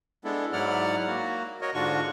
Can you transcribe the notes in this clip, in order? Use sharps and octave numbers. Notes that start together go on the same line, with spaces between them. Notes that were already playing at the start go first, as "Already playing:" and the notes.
G#3 B3 D4 E4 A4
G#2 F#3 E4 D5 F#5 F6
A#3 F#4
F#4 A#4 C#5 D#5
G#2 D3 D4 F4 F#4 C#6